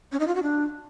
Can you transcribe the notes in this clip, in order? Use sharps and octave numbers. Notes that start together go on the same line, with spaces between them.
C#4
D#4
F4
F#4
D4